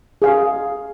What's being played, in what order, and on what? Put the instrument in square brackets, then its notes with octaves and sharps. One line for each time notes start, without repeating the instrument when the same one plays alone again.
[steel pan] G#4 F5